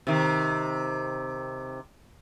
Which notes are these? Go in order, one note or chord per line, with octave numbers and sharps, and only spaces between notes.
C3 D#3